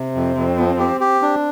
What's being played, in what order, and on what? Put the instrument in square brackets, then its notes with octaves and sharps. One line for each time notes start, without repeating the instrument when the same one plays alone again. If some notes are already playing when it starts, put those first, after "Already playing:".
Already playing: [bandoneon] C3 [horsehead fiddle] C4
[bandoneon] F2
F2
F3
G4
G4
D4